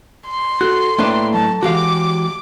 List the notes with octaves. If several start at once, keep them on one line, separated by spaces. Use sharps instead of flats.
C6
F#4 A4 F#6
A2 A#3 D4 B4 E5 G5
F#3 A5
E3 G#3 F#4 G4 F5 D6